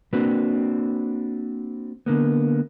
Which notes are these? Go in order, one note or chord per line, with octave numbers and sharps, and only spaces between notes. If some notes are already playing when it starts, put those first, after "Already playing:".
A#3 C4 D4 F#4 B4
D3 A#3 B3